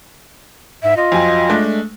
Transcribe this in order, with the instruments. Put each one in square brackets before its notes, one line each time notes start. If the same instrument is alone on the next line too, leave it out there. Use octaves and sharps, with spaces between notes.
[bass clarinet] G#2 [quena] E5
[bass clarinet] F4 [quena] D#5
[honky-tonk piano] F2 F#3 G#5
G#3 A3 D4